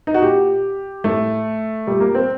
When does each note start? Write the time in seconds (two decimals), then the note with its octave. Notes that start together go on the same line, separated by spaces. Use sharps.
0.07 D#4
0.14 F#4
0.22 A#2 G4
1.04 A2 A3
1.87 A#2 G3
2.00 A#3
2.15 C4